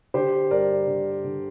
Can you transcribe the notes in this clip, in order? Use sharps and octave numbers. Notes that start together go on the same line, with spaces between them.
D3 G4 C5
G2 A#4 D5
D3
D3